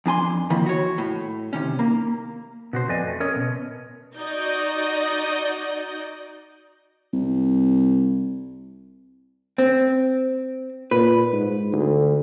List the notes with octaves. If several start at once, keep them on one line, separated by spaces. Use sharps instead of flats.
F2 D4 G#5 C6
D#3 F3 A#3 E4
F#4 C#5
A2
C3 D#3 C#4
A#3
B2 F#4 C5
F2 B4 D5 D#5 G#5
A3
C#4 A#4 C#5 D#5
B2
D#4 F#4 D5 D#5 G6
C2
C4
A#2 B4
G#2
D2